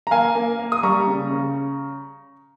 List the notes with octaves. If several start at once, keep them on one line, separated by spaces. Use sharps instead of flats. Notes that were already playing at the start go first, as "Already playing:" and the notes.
A#5
A#3 F5 G#5
A#3
A#3
D#6
G3 A#5 C#6
C#3
C#3